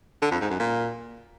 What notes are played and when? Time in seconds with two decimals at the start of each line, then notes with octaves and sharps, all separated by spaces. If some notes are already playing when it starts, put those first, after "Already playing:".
0.22 D3
0.31 F2
0.41 G#2
0.50 F#2
0.60 A#2